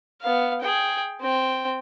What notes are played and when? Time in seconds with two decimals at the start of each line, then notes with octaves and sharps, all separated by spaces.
0.22 B3 F5
0.61 G#4 G5
1.21 C4 G5